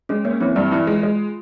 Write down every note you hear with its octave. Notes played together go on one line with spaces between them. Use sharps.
G#3 C#4
A#3 C#4
E3 C4
G2 E4
E3
G#3 F4
G#3